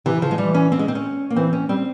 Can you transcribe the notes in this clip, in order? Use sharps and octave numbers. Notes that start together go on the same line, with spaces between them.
C3 E3
C#3 F3
G#3
E3 G3
C#4
C4
G#3
C4
C#4
A#3
E3 C4
C#4
G3 C4